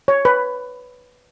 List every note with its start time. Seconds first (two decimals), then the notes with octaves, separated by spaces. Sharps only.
0.08 C#5
0.25 B4